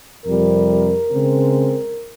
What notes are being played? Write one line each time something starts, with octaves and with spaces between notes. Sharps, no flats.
F2 C3 G3 A#4
C#3 G#3 C4